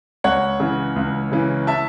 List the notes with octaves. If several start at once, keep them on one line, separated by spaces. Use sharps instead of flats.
C#2 C#5 F#5
C#3 E3
C#2
C#3 E3
E5 A5